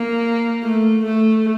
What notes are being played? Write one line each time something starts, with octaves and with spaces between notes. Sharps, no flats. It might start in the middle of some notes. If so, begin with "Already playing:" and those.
Already playing: A#3
A3
A3